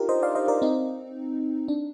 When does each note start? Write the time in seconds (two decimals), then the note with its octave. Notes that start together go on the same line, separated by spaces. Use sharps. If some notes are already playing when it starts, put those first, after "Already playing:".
Already playing: D4 D#4 F4 G4 A#4
0.09 C5 D#5
0.22 D5 F5
0.35 C5 D#5
0.48 A#4 D5
0.62 C4 D#4
1.68 D4